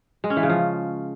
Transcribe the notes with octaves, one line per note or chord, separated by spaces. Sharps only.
G#3
C#4
E3
C#3
F3